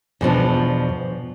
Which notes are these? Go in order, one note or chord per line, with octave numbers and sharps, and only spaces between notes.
E2 B2 F3 D4